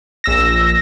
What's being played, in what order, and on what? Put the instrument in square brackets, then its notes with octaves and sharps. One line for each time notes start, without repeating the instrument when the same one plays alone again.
[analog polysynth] A#1 E6 A#6